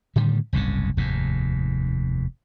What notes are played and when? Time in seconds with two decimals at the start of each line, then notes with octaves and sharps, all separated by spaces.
0.16 A2 D3 D#3 G3
0.53 F#1 C2 G#2 C#3
0.97 F1 D#2 G#2